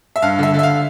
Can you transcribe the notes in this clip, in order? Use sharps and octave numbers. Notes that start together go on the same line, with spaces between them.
E5
G2 F5
D3 E5
D3
E5
F5